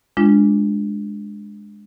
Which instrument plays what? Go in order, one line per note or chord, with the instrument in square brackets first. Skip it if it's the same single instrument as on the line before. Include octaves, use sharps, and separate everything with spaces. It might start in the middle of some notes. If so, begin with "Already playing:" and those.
[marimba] G#3 D4 F4